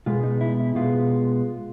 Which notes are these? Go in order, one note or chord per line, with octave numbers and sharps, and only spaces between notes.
B2 G#3 B3 F4
D#4
E4
E4
B2 G#3 B3 F4